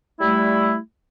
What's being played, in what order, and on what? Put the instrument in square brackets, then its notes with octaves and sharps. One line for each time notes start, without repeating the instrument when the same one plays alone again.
[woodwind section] G3 A3 E4